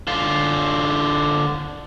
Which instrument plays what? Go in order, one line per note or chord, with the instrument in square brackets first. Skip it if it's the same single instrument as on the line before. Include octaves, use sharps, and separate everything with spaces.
[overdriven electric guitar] D3 F4